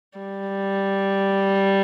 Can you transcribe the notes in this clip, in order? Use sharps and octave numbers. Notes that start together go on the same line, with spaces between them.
G3